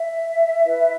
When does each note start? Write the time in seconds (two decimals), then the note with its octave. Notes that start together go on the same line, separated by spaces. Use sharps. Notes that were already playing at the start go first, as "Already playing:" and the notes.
Already playing: E5
0.65 E4 B4